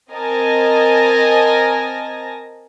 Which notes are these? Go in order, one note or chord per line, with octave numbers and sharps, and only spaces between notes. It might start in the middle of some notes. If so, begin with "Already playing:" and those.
C4 A#4 D#5 G#5 A5 A#6